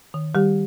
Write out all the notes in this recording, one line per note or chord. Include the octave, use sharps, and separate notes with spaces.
D#3
D#3 G3 G4